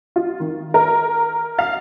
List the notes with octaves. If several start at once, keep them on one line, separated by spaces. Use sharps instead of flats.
F4
D#3
A#4
F5